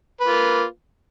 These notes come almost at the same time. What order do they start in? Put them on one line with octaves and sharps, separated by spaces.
B4 A#3 F4